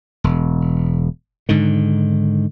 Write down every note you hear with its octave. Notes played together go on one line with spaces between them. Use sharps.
E1
G#2 D3 D#3